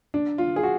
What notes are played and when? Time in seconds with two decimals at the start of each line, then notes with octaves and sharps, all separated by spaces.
0.14 D4
0.38 F4
0.56 G#4
0.63 F#4